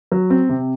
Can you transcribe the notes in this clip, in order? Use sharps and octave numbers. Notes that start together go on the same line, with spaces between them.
F#3
C4
C3